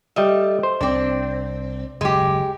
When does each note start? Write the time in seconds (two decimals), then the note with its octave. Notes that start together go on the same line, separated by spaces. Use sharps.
0.16 G3 A3 D#5 E5
0.63 C5
0.81 C2 C4 D4
2.01 F#1 D#2 G#3 G4